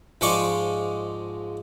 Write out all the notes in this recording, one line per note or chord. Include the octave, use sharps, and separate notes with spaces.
G#2 F3 G#3 D5 C#6 D6